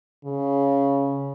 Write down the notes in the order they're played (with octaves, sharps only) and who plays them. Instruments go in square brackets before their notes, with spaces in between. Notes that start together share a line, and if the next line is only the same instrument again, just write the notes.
[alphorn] C#3